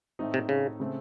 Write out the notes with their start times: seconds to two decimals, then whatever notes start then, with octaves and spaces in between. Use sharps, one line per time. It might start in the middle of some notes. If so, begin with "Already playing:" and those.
0.19 A2 A3 C4 D#4
0.34 C3
0.49 C#3
0.80 C#3 A3 C4